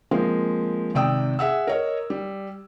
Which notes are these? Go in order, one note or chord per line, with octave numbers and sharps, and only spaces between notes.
F3 G#3 A#3 C4
G#1 C3 D5 G5 D#6 E6
G#4 E5 F#5 E6
A#4 C#5 D#5
G3